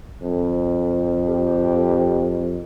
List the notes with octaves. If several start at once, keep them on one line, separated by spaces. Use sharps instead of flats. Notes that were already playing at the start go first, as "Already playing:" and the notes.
F2
G4